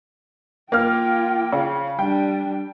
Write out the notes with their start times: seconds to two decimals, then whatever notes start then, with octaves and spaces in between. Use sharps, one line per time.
0.72 A#3 F4 G5 F6
1.52 C#3
1.99 G3 D4 G5